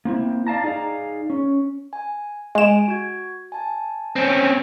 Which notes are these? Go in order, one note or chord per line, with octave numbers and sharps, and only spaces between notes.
A#3 C4 E4
D5 F5 A5 A#5
D#4 G#4 D5 F5 A#5
C#4
G#5
G#3 G#5 D7 E7
F#4 G#6
G#5 A5
C4 C#4